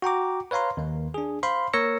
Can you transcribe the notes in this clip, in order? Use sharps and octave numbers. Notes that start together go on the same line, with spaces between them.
F#4 G5 A#5 D6
B4 C#5 F5 A#5 C6
D#2 A#3
D4 G#4
C5 F5 B5 C6
A#3 A#4 C#5 E6 A#6 C#7